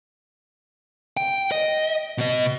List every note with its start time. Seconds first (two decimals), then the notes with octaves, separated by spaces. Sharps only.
1.17 G5
1.52 D#5
2.18 B2 D#5